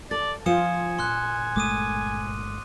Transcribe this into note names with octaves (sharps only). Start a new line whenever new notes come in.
A4 D5 A6
F3 F4 C5 G#5 D#6 C#7 E7
A#2 C6 F6 F#6
G1 G#3 A3 D6 D#6 D#7